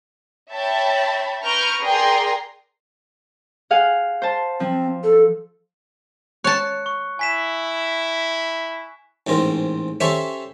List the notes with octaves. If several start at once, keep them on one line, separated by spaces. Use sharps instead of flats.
C#5 E5 G5 A5 B5
B4 A#5 C#6 F6 G6 D7
G#4 A#4 D5 G5 A#5 C6
G#4 F5 F#5
C5 A5
F3 C4
A4
C#5 A5 F#6 C#7
C#6
E4 G#5 B6 E7
A1 G#2 C4 A#4
C#4 G4 A4 C5 C#5 E5